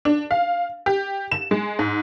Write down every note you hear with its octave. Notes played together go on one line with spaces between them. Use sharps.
D4
F5
G4
E7
G#3
G#2